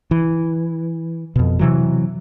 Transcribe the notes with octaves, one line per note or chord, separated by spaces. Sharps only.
E3
F2 B2
C3 E3 F#3